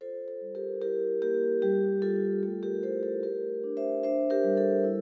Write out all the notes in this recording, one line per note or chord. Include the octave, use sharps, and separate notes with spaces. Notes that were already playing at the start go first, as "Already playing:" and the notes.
F4 A4 C5
A4
G3
G4 A#4
E4 G4 A#4
A#3 G4 A#4
G3 G4
F4 A4
A3 A4
G4 A#4
E4 A4 C5
A4
A3 G4 A#4
D4
C5 E5
D4 C5 E5
G4 A#4
G3
A4
E4